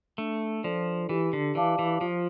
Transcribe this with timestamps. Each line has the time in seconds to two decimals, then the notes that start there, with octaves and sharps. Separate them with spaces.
0.18 A3 D4
0.64 F3 F4 A4 D5
1.09 E3 G4
1.33 D3
1.55 E3 D5 F5 A5 D6
1.79 E3
2.01 F3 F4